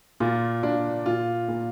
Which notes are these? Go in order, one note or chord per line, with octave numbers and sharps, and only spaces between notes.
A#2 F4
A#2 D4
A#2 F4
A#2